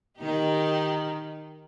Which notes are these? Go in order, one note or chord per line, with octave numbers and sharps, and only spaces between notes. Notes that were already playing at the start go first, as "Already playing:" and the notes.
D#3 D#4 G4